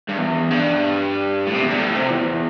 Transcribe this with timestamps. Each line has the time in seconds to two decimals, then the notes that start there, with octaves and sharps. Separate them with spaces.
0.09 G2
0.18 E2
0.50 G2
1.47 A2
1.54 C3
1.62 E2
1.70 G2
1.78 A2
1.95 C3
2.11 E2